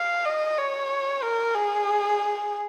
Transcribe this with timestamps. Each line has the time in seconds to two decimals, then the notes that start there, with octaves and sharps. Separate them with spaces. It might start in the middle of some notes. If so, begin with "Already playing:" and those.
Already playing: F5
0.25 D#5
0.58 C#5
1.23 A#4
1.55 G#4